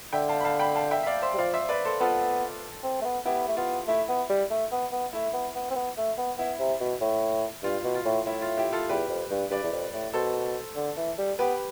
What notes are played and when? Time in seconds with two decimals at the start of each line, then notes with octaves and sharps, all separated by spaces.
0.13 D3 E5 G5
0.29 F5 A5
0.41 B5
0.44 F5 A5
0.59 G5 B5
0.75 F5 A5
0.91 E5 G5
1.03 E5
1.07 D5 F5
1.22 C5 E5
1.34 G3
1.38 F3 D5 F5
1.53 C5 E5
1.69 B4 D5
1.85 A4 C5
2.01 B3 F4 A4
2.83 C4
3.01 A3
3.05 B3
3.25 B3 E4 G4
3.49 A3
3.57 B3 F4
3.88 A3 E4
4.09 B3
4.30 G3
4.50 A3
4.72 B3
4.92 B3
5.13 A3 E4
5.34 B3
5.55 B3
5.71 C4
5.76 B3
5.97 A3
6.18 B3
6.38 B3 E4
6.59 C3
6.80 B2
7.01 A2
7.63 G2 F4
7.84 B2
7.95 F4
8.05 A2
8.26 A2 E4
8.42 F4
8.57 E4 G4
8.73 F4 A4
8.89 E2 G4 B4
9.09 F2
9.31 G2
9.51 G2 B4 D5
9.64 E2
9.72 F2
9.94 A2
10.13 B2 A4 C5
10.76 D3
10.97 E3
11.18 G3
11.39 B3 G4 B4